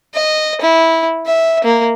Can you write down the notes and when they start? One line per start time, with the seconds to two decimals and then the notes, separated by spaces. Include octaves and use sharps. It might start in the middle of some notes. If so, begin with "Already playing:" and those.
0.14 D#5
0.61 E4
1.26 E5
1.64 A#3